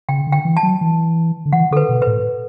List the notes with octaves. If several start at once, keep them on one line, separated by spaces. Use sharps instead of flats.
C#3 G5
D3
G5
E3
A5
F#3
E3
D3
E3 F#5
D3 A4
B4
B2
A2 B4